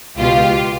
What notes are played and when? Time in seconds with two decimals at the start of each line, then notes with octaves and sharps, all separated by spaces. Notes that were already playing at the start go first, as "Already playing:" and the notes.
0.16 C#2 B2 F4 G4